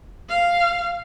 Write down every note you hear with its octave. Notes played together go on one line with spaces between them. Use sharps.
F5